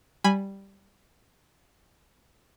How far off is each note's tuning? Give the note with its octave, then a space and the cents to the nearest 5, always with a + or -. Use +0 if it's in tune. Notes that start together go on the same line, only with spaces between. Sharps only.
G3 +0 G#5 -10 B5 +0